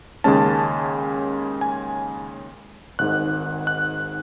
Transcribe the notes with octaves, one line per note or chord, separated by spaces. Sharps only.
D#2 C#3 G#3 C#4 A5
G#5
G#1 G#2 D#3 F#6
F#6